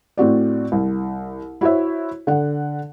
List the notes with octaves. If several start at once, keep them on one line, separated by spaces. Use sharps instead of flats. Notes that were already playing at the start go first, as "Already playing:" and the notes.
A2 C4 F#4 D5
C2
E4 F#4 C5 C#5 E5
D3 F#5